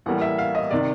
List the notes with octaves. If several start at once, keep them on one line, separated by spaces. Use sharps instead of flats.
A1 A2 E3 G3 A#3 F#5
E5
F5
D#5
C3 D#3 D5